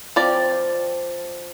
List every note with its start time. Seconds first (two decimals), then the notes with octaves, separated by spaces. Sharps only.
0.16 F3 C4 D5